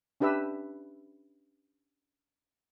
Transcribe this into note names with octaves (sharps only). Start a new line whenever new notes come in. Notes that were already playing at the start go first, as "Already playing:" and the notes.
C#4 D4 G4 B4 E5 E6